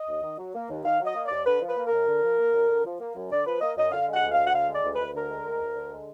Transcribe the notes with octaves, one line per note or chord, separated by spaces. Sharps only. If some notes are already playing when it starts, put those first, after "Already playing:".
Already playing: D#5
D#2
D#3
F#3
A#3
D#2
D#3 F5
F#3 D#5
A#3
D5
D#2
D3 B4
F3
B4
A#3
A#4
F#2
D3
F3
A#3
F#2
D3
F3
A#3
F#2
D3 D5
F3 B4
A#3 D#5
F#2 D#5
D3 F5
G#3 F#5
D2
F5
D2
F#5
D3 F5
G#3
D5
D2
D2 B4
D3 A#4
G#3
D2
D2
D3
G#3